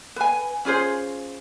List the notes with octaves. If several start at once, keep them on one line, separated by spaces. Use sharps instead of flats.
B4 G#5
C#4 F4 G#4 C5